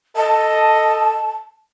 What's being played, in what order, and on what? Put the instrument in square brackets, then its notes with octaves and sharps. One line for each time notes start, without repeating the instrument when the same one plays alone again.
[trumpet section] A4 D#5 [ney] A5